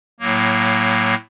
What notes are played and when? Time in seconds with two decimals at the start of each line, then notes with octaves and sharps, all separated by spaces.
0.20 A2 F#3 A#3